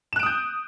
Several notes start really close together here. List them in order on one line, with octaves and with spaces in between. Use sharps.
E7 F#6 D7 D#6 G6